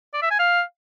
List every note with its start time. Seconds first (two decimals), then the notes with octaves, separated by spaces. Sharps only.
0.14 D5
0.22 E5
0.31 G#5
0.39 F5